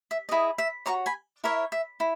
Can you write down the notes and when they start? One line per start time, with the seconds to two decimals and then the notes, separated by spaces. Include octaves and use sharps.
0.11 E5
0.29 E4 G#4 D#5
0.58 E5
0.86 F#4 C#5 A#5 C#6
1.06 G#5 B5
1.44 E4 A#4 C#5 E5
1.72 E5
2.00 E4